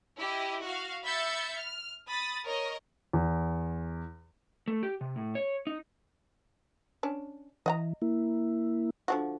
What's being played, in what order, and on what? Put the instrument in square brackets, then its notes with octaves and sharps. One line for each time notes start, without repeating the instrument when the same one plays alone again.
[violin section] E4 G4 D#5
F#4 F5
E5 B5 E6 G6 A6 C#7
F6
B5 D#6 A6
A#4 C#5 D#5
[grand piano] E2
[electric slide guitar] A3
G4
C3
A2
C#5
D#4
[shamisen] C#4 D4
[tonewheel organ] E3 [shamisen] D#5 F#5 A#5
[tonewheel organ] A#3 E4
[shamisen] D3 F3 F#4